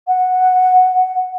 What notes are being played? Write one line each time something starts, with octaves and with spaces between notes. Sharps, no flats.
F#5